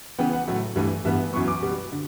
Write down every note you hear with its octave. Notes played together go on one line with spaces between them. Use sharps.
C#3 E3 B3 G5
F#5
A2 F#3 A3
G2 E3 A3
G2 E3 B3 E5
F#2 E3 B3 C#6
D6
B2 G3 B3
D3